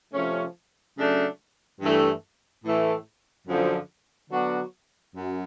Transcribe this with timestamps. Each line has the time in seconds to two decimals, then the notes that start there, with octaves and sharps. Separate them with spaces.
0.13 C3 F3 A3 C#4
0.97 C#3 F#3 A3 D4
1.81 G2 E3 A3
2.65 A2 E3 A3
3.48 F#2 D3 F3
4.31 D3 F#3 B3 D4 F#4
5.15 F#2